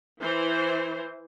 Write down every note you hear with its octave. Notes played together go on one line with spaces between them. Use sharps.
E3 C5